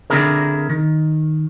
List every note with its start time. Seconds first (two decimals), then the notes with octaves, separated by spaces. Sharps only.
0.10 D3 C4 D4 E4 G#4 A#4
0.70 D#3